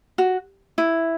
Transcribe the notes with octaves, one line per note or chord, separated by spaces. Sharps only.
F#4
E4